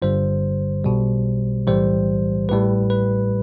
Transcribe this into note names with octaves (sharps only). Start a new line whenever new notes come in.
G1 G2 D3 G3 C5
B1 B2 G3
B1 A2 E3 G3 C5
A1 A2 G3 B4
B4